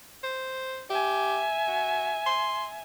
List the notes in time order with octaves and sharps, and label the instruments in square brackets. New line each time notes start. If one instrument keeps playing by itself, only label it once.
[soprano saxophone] C5
[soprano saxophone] G4 [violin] E5 G#5
[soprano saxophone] F#4
C6